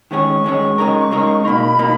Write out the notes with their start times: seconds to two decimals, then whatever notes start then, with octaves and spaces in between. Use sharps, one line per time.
0.11 D#3 G#3 C#4 G#4 C#5 C#6
0.44 D#3 G#3 C#4 G#4 C#5
0.78 C#3 G#3 D#4 A#4
1.11 C#3 G#3 D#4 A#4
1.45 B2 A#3 D#4 B5
1.79 B2 A#3 D#4